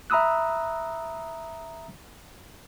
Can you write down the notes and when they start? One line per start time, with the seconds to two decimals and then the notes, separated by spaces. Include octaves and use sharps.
0.10 E5 A#5 B5 D#6 E6 F#6